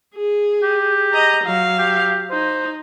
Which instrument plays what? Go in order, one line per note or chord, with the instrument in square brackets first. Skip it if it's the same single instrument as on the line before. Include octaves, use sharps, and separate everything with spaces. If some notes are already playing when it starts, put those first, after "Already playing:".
[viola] G#4
[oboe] G4
[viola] D#5 A#5
F#3 F5
[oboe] G4
[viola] D#4 [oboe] C5